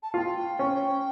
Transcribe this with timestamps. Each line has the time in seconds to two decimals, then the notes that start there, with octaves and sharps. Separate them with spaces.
0.03 A5
0.14 F4 G5 A5
0.59 C#4